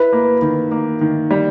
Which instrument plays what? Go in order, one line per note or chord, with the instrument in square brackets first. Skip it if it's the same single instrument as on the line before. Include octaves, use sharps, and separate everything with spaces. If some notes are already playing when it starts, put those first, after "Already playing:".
Already playing: [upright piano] E4 [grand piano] B4
[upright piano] A#3
D#3
A#3
D#3
G3